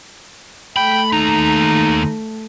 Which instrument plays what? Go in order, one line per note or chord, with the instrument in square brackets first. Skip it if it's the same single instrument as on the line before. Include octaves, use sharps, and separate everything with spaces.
[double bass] A3 [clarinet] G5 [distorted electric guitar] B5
[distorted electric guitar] D#2 A#5 [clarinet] D#4